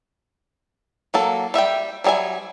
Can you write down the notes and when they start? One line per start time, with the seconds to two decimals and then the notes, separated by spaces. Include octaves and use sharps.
1.14 F#3 A#3 A4
1.54 G3 E5 F#5 G5
2.04 F#3 G3 G#4 E5 G#5